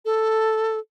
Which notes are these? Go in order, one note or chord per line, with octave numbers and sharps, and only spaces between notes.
A4